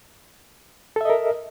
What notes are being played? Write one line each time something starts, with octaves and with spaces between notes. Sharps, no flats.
A4 A#4 D#5 E5